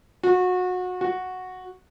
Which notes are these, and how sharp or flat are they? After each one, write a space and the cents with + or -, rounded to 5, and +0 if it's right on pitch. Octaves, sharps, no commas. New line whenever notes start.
F#4 -25
F#4 -5